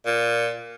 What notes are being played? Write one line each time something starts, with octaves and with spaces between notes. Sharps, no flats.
A#2